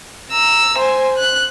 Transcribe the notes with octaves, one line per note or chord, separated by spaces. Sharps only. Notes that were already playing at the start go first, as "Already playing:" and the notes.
A#5 E6
C5 G#5
F#6